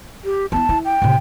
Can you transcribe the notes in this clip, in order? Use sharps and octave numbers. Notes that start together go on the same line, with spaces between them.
G4
B3 E4 A5
E4
G5
A2 C3